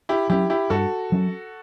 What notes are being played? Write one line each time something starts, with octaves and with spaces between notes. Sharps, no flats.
E4 G4
F#3 C#4 E4 G4
E4 G4
G2 F#4 A4
F#3 C#4